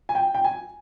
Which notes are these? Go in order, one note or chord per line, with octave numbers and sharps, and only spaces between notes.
G#5
G5
G5
G#5